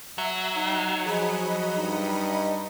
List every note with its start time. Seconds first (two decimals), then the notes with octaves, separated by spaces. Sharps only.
0.18 F#3 E5
0.56 D#4
1.06 F3 G#4 D#5 B5 C#7
1.77 G2 D#4